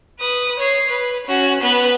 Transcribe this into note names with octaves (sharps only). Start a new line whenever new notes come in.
B4 D#6
C#5 C7
B4
C#4 F#4
B3 B4